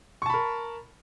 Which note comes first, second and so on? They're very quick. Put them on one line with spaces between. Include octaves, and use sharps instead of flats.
C#6 A5 B5 A#4